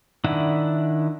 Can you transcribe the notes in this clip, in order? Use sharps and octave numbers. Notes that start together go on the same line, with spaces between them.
D#3 D4 E4 F#5